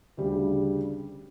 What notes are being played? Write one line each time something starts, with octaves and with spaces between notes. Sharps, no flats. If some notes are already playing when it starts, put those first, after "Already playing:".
D2 C#3 G3